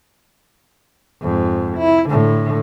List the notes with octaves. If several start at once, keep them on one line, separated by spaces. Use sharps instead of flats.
F2 G#2
E4
A2 D3